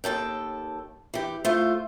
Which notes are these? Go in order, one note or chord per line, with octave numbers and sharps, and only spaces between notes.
D#2 C#3 A4 G5
E3 G4
A3 F4 C5